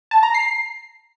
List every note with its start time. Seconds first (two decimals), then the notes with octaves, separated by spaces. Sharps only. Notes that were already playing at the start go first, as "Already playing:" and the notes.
0.11 A5
0.23 A#5
0.34 C7